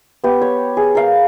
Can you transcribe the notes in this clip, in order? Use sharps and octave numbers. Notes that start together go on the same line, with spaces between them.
B3 G4
C#5
G#4
A#4 F5